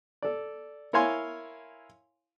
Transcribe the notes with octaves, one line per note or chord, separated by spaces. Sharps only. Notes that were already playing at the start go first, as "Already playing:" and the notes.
A4 D5
E4 A#4 C#5 F5 G#5 C6